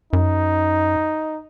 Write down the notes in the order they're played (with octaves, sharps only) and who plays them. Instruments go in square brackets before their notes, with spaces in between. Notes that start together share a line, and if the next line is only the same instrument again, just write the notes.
[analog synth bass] F#2 [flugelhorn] D#4